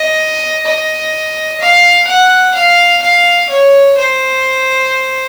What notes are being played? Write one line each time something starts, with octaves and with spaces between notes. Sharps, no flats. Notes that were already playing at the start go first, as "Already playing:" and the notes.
Already playing: D#5
D#5
F5
F#5
F5
F5
C#5
C5